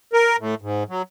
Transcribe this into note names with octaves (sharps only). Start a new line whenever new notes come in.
A#4
A2
G#2
F#3